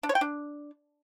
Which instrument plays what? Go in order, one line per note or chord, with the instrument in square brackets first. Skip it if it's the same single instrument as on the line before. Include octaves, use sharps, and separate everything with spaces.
[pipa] D4
C#5
G5
D4